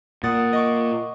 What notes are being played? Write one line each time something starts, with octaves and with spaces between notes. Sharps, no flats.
A#2 F#5 D#6 A6
D#5 C#6 D6